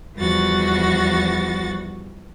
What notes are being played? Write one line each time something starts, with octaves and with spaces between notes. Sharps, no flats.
E2 F3 G3 F#4 A6 A#6